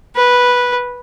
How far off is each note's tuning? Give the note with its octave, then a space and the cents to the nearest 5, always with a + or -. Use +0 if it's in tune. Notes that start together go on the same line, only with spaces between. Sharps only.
B4 -10